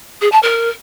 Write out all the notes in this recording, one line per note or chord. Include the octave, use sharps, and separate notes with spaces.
G#4
A5
A#4